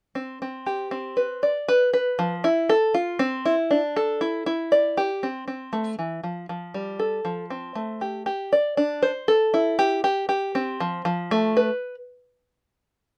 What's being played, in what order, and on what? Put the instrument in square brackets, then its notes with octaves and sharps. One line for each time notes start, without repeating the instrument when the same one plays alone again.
[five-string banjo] C4
C4
G4
C4
B4
D5
B4
B4
F3
E4
A4
F4
C4
E4
D4
A4
E4
E4
D5
G4
C4
C4
A3
E3
F3
F3
G3
A4
F3
C4
A3
G4
G4
D5
D4
C5
A4
E4
G4
G4
G4
C4
F3
F3
A3
B4